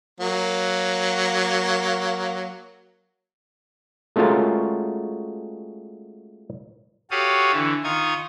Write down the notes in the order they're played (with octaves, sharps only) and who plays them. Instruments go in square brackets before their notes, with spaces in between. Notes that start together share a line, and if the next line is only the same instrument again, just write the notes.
[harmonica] F#3 A#3
[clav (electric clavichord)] G#3 A3 C#4 F4 F#4 A#4
[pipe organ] F#4 G4 A4 C#5 F5 D#6
D3 E3
D#3 D#4 F4 C#6 D#6